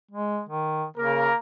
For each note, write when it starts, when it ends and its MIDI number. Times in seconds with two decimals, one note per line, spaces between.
0.11 0.41 56
0.49 0.85 51
0.97 1.29 49
0.97 1.37 58
0.97 1.37 70